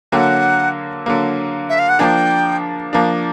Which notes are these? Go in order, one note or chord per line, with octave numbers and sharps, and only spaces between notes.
D3 F#3 A#3 F#5 G5
D3 F#3 A#3
E5
F5
F#5
F3 A#3 D4 G5 G#5
F3 A#3 D4